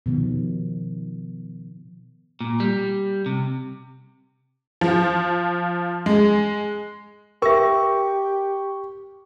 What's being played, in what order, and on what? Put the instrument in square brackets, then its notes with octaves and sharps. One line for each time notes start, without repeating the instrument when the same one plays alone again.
[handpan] B2 D#3 F3
[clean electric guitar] A#2
G3
C3
[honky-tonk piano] F3
G#3
[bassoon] G4 [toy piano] A#4 E5 [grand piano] C#6